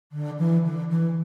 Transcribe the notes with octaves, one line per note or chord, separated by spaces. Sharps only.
D3
E3
D3
E3